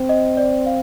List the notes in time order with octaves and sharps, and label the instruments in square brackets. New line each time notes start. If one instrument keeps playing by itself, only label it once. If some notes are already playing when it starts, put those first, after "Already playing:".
Already playing: [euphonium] C4
[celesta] D#5
D5
F5